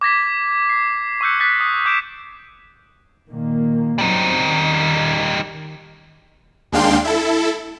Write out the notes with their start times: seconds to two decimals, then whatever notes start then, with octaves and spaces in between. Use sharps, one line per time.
0.01 D6 G#6 A#6 B6
0.70 C7
1.21 C#6 D6 E6 F#6 G6 C#7
1.40 D#6 F#6 A6 B6 C7
1.60 D#6
1.85 D6 G6 D7 E7
3.29 A#2 D#3 A#3
3.98 F#3 G3 C4 D#4
4.42 D#3
6.72 D#2 G#3 D4 F5 G5 C6
7.04 E4 A4